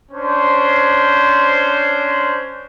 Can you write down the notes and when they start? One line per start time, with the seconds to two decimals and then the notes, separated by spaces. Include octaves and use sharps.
0.12 C#4 D4 C5